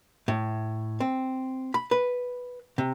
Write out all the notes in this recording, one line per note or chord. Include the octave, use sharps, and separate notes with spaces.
A2
C4
B5
B4
C3